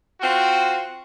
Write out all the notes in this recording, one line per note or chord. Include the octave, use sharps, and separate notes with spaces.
C4 F4 F#4